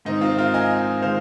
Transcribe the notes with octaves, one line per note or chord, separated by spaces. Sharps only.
G#2 D#3 C4 D#4
C4 F4
F4 A#4
D#5 G#5
D#3 G#3 C5 F5